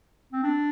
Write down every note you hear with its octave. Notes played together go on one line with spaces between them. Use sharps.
C4
D4